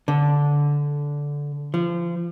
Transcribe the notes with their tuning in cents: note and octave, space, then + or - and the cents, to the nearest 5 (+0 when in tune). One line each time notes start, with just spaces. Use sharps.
D3 -15
F3 -30